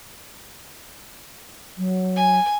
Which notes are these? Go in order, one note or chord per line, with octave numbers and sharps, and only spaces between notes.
F#3
G#5